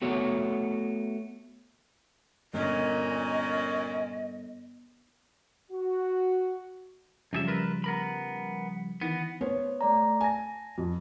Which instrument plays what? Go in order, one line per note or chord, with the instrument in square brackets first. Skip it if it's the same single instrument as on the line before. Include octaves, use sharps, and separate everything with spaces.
[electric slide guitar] A3 B3 F#4 C#5
[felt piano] G1 [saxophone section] A#2 C#4 [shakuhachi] D#5
[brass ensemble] F#4
[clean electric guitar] F#2 G#4 E5 [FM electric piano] C#3 F3 G3
[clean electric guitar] F4 A#4 B4
B3 A#4 B5
[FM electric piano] D#3 E3 A#6 [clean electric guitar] B3
[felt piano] B3 C5 C#5
[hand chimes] A3 D5 A#5
[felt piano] G#5 [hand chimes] A5 A#6
[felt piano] F2